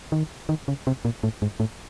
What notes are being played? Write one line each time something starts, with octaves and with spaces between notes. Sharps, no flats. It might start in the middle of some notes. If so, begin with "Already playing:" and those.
D#3
D#3
C#3
C3
A#2
A2
G#2
A2